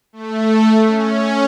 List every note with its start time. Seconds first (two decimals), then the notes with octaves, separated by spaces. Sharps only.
0.13 A3
0.87 C#4